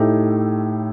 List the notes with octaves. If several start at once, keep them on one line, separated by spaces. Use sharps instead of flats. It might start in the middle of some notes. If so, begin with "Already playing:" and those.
Already playing: A2 A3 D#4 G4